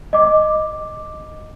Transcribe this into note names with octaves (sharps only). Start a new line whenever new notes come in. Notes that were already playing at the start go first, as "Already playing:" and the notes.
D#5 D6